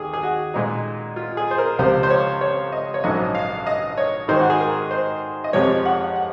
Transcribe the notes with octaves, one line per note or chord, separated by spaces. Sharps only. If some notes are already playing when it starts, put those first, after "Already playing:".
Already playing: D#2 G#4
G#4
F#4
A#2 G#3 D#4
F4
G#4
C5
A#4
C#2 C3 F3 C5
C5
C#5
C#5
D#5
C#5
A#1 G#2 F#3 C#4 D#5
F5
D#5
C#5
G#2 D#3 G#3 C5
F#4
G#4
A#4
C5
D#5
F2 C3 F3 G#3 C#5
F#5
F#5